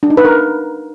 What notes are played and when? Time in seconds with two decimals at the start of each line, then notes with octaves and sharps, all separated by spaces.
0.03 D4
0.10 D#4
0.17 B4
0.25 A#4